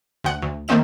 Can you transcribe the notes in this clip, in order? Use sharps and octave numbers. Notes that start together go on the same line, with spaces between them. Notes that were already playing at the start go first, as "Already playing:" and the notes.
D2 F#5
D2
D#3 A3 A#3 C4 D#4 E7